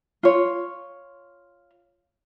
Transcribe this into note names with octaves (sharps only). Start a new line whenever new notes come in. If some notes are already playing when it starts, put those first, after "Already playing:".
F4 C#5